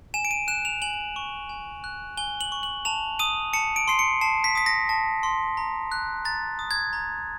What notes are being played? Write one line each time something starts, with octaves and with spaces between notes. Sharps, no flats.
G#5 E7
D7
D#7
F#6 E7
F7
G#5 F#7
C#6
G#5
F#6
G#5 G7
F#7
C#6
F#7
A5 F7
D#6 D#7
A5 C#7
D7
C6 C7
C#7
A5 C7
B6
D#6 B6
A#6
A5
C6
A#5
F#6
A#5 A6
D#6
G#6
A#5